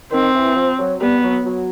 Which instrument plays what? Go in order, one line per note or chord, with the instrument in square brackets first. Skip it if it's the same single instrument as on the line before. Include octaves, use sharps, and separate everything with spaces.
[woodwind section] D#3 [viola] C4
[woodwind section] E3
F3
F#3
[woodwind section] G3 [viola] B3
[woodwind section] F#3
F#3